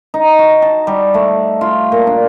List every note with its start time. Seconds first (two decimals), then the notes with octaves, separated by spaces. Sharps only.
0.14 D#4
0.39 F#4
0.62 A5
0.87 G3
1.14 A3
1.61 F4
1.92 A#2
2.07 D4